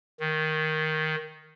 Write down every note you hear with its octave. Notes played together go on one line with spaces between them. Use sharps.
D#3